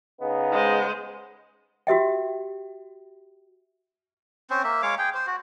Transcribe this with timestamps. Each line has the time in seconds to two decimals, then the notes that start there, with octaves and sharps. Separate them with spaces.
0.20 C#3 B3 D#4
0.52 G#3 C5
1.87 F#4 G4 E5 G5
4.50 C4 C#4 C5
4.64 A#3 E5
4.82 G#3 C#5 F5 D6
4.98 G#4 G5
5.14 C5
5.27 F#4